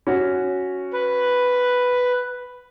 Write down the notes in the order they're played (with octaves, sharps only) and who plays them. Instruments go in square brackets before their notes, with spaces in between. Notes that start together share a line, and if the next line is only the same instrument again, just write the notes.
[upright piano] C#4 F#4
[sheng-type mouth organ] B4